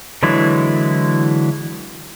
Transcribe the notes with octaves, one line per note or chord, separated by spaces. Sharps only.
D3 E3 F#3 G#3 E4